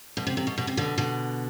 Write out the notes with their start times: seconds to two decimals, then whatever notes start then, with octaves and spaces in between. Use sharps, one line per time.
0.17 B2
0.27 C3
0.37 C3
0.47 B2
0.57 B2
0.67 C3
0.77 B2 D3
0.98 B2 D3